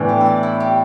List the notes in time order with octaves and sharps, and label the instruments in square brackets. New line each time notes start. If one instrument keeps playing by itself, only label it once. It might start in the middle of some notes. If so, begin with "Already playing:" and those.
Already playing: [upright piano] A2 E3 B3 D4
[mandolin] G4
E5
D5
E4
G4